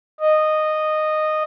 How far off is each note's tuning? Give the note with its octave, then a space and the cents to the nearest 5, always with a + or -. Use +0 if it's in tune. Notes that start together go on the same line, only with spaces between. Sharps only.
D#5 -10